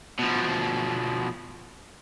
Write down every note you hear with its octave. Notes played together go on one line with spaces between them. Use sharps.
B2 F3